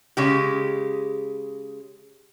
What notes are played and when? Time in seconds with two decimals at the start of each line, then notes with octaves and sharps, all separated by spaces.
0.17 C#3 G#3 G4